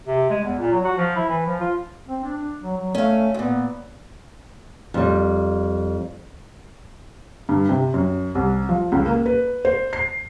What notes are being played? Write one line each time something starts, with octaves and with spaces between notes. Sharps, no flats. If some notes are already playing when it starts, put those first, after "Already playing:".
C3
G#3
E2
A#2
F#3
F#4
F3
E4
E3
F3
F4
C4
D4
F#3
F#3
A3 C#4 F5
D2 A#2 B3
F2 G3
G2
C3
F#2
C2
F3
C#2
A#3
B4
C5
C7